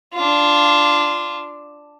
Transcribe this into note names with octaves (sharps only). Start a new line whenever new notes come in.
D4 F4